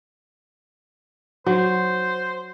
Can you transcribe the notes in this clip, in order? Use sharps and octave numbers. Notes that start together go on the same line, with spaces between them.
F#3 C5